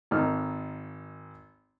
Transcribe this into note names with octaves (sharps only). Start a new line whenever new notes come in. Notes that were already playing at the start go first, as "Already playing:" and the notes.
G#1 D#4 A4 F6